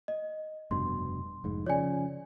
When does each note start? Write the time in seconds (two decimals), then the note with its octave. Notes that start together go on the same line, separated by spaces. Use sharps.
0.08 D#5
0.71 F1 G2 B2 C6
1.44 F1 G#2
1.66 C#3 F3 C#5 D5 G#5